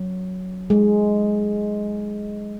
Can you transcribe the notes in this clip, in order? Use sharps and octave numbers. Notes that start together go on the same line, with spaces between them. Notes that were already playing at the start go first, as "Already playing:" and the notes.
Already playing: F#3
G#3